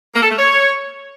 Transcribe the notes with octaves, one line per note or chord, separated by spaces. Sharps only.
A#3
A4
A3
C#5